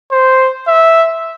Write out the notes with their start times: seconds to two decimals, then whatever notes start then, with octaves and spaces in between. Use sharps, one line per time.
0.12 C5
0.68 E5